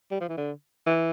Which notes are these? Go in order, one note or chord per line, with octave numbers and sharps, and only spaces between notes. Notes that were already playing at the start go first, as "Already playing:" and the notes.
G3
F3
E3
D3
E3